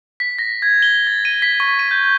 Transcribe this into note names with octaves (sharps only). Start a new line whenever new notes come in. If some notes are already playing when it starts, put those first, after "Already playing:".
B6
A#6
G#6
G7
A6
D#7
B6
C#6
D#7
G6
G6